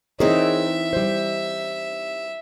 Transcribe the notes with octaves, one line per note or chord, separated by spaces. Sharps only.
E3 C4 D#4 G#4 A#4 C#5 E5
G3 C5